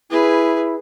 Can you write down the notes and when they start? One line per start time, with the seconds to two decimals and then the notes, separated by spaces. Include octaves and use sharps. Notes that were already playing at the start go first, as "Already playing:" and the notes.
0.10 E4 G#4 B4